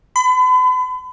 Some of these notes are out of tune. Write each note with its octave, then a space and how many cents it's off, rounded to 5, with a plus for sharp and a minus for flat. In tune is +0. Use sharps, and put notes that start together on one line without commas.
B5 +40